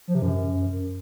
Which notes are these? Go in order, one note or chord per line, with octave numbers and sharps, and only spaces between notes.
F3
C3
F#2